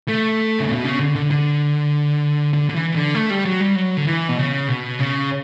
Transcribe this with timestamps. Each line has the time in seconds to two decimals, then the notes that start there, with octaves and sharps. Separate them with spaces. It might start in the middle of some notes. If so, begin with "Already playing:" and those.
0.08 A3
0.60 C#3
0.69 B2
0.84 C#3
1.00 D3
1.16 D3
1.31 D3
2.53 D3
2.69 D3
2.74 E3
2.95 D3
3.15 A3
3.30 G3
3.45 F#3
3.61 G3
3.76 F#3
3.97 D3
4.06 E3
4.29 B2
4.38 C#3
4.68 B2
4.99 C#3